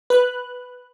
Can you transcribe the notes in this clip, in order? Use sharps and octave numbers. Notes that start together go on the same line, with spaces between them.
B4 F#6